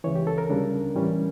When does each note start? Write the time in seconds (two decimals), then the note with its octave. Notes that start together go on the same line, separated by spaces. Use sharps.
0.04 C#2 C#3 E3 C#5
0.16 G4
0.27 A4
0.38 A#4
0.50 D2 C#3 G3 D4
0.95 A2 E3 G3 C#4